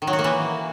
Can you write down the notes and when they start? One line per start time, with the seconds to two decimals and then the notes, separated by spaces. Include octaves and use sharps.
0.02 D#3
0.07 F#3
0.13 F#4
0.19 A#3
0.24 E3